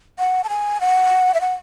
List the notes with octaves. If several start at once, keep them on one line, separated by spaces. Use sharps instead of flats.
F#5
A5
G#5
F#5
E5
F#5